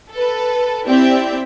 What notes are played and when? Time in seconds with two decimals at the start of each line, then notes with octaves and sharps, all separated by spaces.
0.10 A4 B4
0.87 C4 E4 G4 D5 E5 G5